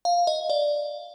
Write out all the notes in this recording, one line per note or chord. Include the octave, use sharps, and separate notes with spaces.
F5
D#5
D5